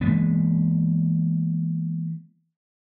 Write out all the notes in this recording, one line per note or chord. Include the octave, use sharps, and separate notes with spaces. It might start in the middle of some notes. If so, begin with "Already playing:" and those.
E3 G#3 A#3 B3